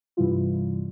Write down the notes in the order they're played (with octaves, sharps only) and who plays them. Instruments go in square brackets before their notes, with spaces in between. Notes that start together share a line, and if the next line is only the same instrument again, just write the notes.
[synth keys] G2 C3 E3 G3 E4 F4